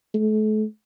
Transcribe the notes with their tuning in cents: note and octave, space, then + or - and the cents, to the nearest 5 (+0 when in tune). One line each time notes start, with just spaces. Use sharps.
A3 -40